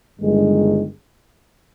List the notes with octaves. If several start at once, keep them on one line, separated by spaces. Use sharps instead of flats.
G1 G2 D#3 G#3